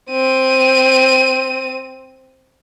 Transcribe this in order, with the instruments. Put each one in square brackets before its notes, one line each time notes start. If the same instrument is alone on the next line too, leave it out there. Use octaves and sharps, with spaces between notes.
[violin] C4 D#7